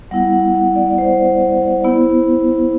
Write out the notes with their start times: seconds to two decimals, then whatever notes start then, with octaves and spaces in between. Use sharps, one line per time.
0.11 G3 B3 E4 F#5
0.33 F#5
0.55 F#5
0.76 D5
0.98 C5
1.84 B3 E4